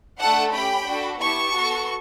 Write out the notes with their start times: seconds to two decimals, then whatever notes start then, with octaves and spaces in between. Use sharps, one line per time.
0.21 A3 D4 A4 F#5 A5
0.54 C#4 G4 G5 B5
0.87 D4 F#4 A4
1.20 B3 E4 G4 A5 C#6
1.53 B3 F#4 A4